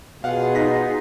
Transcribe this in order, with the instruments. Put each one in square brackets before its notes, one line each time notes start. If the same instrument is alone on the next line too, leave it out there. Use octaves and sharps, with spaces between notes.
[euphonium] B2 [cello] F4 G#4 [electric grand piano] F5 F#5
[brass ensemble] D#4 [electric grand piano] F#5 A#6 B6